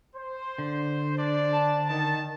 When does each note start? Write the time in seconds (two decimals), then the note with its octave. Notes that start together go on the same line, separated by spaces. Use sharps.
0.15 C5
0.58 D3
1.18 D4 C5 D5
1.53 A5
1.89 D#3 A5